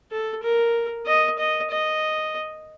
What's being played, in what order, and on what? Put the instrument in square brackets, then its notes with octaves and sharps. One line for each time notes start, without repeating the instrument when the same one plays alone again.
[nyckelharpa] A4
A#4
D#5
D#5
D#5